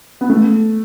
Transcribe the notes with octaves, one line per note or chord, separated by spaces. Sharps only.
B3
A3